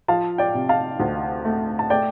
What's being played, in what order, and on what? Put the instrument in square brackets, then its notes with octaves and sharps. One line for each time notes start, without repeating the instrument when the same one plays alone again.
[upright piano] F3 F5 A5
D5 G5
C3
F5 A5
D2
A3
A5
A3 D5 G5